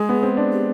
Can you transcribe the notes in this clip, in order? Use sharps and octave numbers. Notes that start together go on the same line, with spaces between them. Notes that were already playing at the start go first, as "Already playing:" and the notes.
Already playing: G#3 G#4
B3
C4
D4
G4